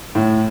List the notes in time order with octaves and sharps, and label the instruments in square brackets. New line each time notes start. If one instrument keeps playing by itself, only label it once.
[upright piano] A2